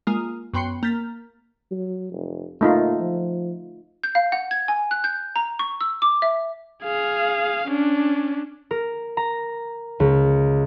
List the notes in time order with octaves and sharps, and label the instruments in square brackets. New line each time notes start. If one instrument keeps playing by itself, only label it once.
[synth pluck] G#3 A#3 F4
F#2 B3 G5 C6 C7 C#7
A#3 G6 A6 B6
[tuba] F#3
F1
[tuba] A#2 [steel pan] A3 D#4 F4
[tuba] F3
[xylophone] G6
F5
F#5
G#6
G#5
F#6
G6
A#5
C#6
E6
D6
E5
[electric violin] G#4 F5
C#4 D4
[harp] A#4
A#5
C#2